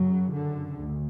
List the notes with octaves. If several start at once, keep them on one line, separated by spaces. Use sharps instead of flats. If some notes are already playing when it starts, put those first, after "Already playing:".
Already playing: F#2 C#3 F#3
D3
D2